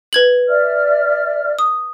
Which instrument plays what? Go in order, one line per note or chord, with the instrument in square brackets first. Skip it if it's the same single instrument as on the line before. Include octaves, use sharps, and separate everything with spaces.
[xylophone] B4 G#6 F#7
[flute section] D5 E5 F6
[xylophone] D#6